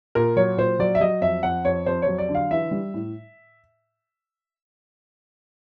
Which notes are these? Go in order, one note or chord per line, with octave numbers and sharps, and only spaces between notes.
A#2 A#4
F#3 C#5
A#2 C5
F#3 D5
E5
F#3 D#5
F2 E5
F2 F#5
F2 C#5
F2 C5
F#3 C#5
D5
D3
F5
E3 E5
G3
A2